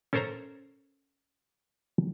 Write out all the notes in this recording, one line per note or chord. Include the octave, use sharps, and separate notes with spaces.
C#4 A4 A#4 C5 C#5 A#5